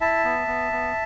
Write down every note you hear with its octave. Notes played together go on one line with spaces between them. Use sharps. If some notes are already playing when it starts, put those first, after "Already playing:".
E4 E5 A5
B3
B3
B3